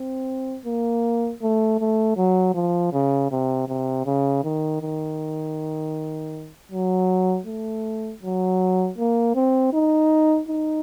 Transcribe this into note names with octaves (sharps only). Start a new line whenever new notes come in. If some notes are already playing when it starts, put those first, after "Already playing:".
Already playing: C4
A#3
A3
A3
F#3
F3
C#3
C3
C3
C#3
D#3
D#3
F#3
A3
F#3
A#3
C4
D#4
D#4